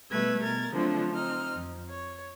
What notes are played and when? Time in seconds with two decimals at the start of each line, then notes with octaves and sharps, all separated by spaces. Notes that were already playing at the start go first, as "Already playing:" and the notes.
0.11 B2 G3 A3 B4 E6 G#6
0.43 B2 A#4 G#6 A6
0.73 D3 F3 F#3 A3 C4 D4
1.11 C4 D#4 F6
1.53 F2
1.90 C#5